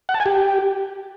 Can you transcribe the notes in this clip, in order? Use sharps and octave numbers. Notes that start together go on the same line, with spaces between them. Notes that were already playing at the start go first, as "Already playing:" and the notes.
F#5
A5
G#5
G4